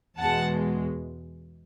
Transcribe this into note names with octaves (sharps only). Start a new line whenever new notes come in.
E2 B2 G#3 F#5 A5